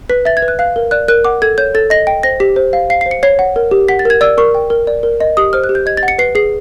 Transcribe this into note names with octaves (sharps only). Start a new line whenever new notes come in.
B4 B6
E5 A6
G#6
B4
F#6
F5 F#6
A#4
D5 F#6
A#4 F#6
F#5 D6
A4 G#6
C#5 G6
A4 A6
D#5 A#6
G5
C5 A#6
G4 B6
C5
F5
F5 C7
C5 C7
C#7
C#5 C7
F#5
A#4
G4
F#5 B6
A6
A#4 G#6
D5 E6
A#4 C#6
G5
A#4
D5
A#4
D#5
G4 D#6
C5 F6
F#6
G4
G6
D#5 G#6
A6
F#5
C#7
B4 C7
G#4 C7